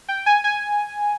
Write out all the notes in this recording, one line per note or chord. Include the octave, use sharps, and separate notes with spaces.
G5
G#5
G#5